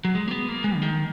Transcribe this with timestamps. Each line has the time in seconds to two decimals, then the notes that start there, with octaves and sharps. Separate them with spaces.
0.05 F#3
0.15 G#3
0.28 A#3
0.31 B3
0.48 A#3
0.64 G#3
0.76 D3
0.82 D#3